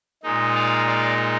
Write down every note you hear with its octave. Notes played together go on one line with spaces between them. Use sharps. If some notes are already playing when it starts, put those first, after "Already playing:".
A#2 G#3 D#4
D5 F5
D5 F5